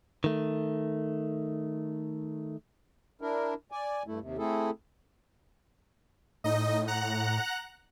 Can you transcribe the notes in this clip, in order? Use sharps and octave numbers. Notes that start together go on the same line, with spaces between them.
D#3 A3
D4 E4 A#4
D5 G#5
G2 A3 E4
D#2 C3
A3 C4 E4 G#4 A4
A2 D#4 D#5
F#5 A#5 F#6